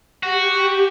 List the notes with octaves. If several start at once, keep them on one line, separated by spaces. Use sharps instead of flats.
F#4 G4